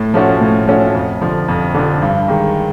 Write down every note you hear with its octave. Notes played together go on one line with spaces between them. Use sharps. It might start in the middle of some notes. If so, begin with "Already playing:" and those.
Already playing: A2
F3 A3 C#4 F#4
A2
F3 A3 C#4 F#4
F2
D3 F3
F2
D3 F3
G2
D#3 G#3